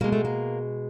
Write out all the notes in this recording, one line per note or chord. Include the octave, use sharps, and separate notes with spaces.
B2 G#3 A#3
A3
A#3